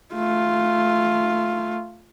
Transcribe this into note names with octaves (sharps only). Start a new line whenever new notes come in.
A3 F4